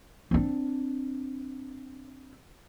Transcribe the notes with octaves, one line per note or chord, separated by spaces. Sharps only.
C4 D4